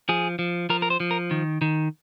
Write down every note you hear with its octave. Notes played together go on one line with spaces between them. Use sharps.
F3 G#4
F3
F3 A#4
A#4
C5
F3
A#4
D#3
D#3